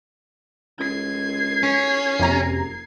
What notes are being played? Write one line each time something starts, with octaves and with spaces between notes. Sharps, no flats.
C#2 G#6 C7
C#4
F#1 F2 C3 A#5